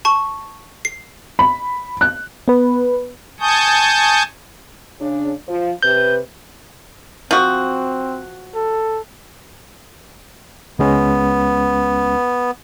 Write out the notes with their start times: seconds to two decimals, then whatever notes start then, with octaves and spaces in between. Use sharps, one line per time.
0.05 A5 C#6
0.85 C7
1.39 B5
2.01 F#6
2.48 B3 B4
3.40 G#5 A5 C#6 D#6 G6
5.00 C#3 D4
5.48 F3
5.83 C3 B4 G6
7.31 F3 C4 F#4
8.55 A4
10.79 C#2 G#3 B3 C#4